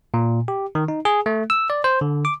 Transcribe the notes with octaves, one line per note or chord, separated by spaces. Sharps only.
A#2
G4
D#3
D#4
G#4
A3
E6
D5
C5
D3
D6